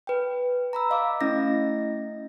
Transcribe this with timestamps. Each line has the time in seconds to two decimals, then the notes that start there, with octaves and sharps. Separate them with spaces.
0.07 B4 G5
0.73 A#5 B5 E6
0.90 D#5 F5 D6
1.21 A3 C#4 E4 D#5 A#6